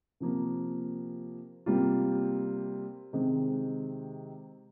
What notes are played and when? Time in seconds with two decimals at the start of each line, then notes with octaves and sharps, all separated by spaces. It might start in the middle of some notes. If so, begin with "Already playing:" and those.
0.20 C3 F3 A#3
1.66 C3 G3 A#3 F4
3.13 C3 D#3 G#3 C4